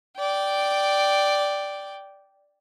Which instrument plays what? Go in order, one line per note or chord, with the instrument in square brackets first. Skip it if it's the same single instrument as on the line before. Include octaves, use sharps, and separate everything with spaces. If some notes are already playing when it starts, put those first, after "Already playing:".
[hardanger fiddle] D5 G5